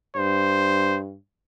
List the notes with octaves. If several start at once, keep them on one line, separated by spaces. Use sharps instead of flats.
G2 C5